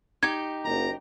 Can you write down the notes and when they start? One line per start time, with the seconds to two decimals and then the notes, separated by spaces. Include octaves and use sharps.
0.23 D#4 G4 G#6
0.65 F#1 A#5